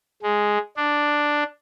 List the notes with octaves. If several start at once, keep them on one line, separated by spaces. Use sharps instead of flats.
G#3
D4